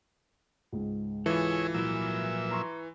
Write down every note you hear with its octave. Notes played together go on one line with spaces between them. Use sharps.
C#2 G#2
E3 F4 G#4 A4 C#5 E5
A#2 F3 F#3 E4 E5
A#5 C6 C#6